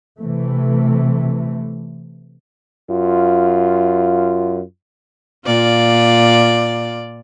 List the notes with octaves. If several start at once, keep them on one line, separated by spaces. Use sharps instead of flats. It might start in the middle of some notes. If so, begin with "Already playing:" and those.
C3 E3 A3
F#2 F4
A#2 F4 D5